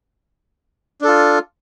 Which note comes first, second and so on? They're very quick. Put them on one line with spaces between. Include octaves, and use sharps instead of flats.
D4 A4 F4